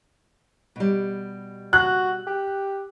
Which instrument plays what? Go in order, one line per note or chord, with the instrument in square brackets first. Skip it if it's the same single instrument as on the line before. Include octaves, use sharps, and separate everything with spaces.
[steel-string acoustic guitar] B2 G3
[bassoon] F#4 [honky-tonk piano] F#6
[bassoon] G4